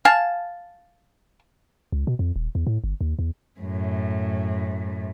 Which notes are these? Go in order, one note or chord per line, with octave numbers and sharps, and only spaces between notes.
F5 G#5 A5
C#2
B2
F2
D#1
E2
A2
G1
D#2
E2
F#2 A2